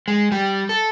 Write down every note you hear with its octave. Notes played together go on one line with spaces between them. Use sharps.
G#3
G3
A4